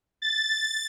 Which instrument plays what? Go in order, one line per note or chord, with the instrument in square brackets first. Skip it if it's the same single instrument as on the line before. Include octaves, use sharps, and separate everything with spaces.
[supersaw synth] A6